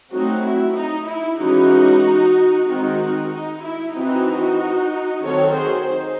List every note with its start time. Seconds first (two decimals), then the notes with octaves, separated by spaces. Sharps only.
0.13 F#3 A3 C4 D#4 F#4
0.44 E4
0.76 D#4
1.08 E4
1.40 E3 G#3 C#4 D#4 F#4
2.67 D#3 G#3 C4 D#4 F#4
3.31 D#4
3.63 E4
3.95 E3 C4 D#4 F#4
5.22 D#3 F#3 C4 A4 C#5
5.54 G#4 C5
5.86 D#4